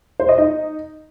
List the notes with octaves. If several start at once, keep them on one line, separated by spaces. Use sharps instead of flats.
C5
D#5
D#4